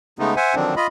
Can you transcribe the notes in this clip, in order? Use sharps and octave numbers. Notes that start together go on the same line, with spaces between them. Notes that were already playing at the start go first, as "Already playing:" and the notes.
C#3 G#3 A3 B3 D#4
C5 E5 F#5 G#5
D3 D#3 F3 F#3 C4 D4
F4 D#5 B5